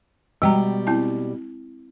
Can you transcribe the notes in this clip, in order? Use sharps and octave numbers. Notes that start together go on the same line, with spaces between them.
B2 G3 G#3 G5 A#5
C4 E4 A5